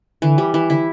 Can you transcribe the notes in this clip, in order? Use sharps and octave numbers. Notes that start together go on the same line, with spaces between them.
D3 E3
G3
E3
D3 E4